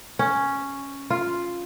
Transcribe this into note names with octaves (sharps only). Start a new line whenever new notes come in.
C#4
F4